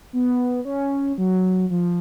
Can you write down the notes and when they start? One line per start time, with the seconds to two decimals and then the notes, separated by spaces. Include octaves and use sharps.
0.13 B3
0.65 C#4
1.18 F#3
1.70 F3